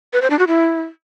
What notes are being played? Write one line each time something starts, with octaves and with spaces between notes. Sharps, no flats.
B4
C5
D4
F#4
E4